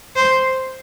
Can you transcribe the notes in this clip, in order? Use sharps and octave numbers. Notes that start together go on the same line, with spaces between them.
C5